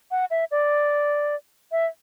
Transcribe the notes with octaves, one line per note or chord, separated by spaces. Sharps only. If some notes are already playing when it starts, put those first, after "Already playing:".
F#5
E5
D5
E5